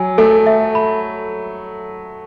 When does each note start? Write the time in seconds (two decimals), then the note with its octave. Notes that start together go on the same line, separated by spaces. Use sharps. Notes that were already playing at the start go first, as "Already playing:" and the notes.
Already playing: F#3 G#5
0.18 A3 A4
0.47 E5
0.75 B5